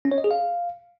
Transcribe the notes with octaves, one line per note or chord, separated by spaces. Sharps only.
C#4
C#5
D#5
G#4
F5